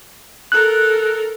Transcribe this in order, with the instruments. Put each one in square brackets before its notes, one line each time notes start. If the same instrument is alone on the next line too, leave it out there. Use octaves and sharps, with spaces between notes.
[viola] A4 A#4 [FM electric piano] F#6